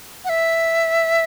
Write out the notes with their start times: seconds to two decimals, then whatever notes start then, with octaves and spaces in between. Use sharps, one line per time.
0.25 F#5
0.29 E5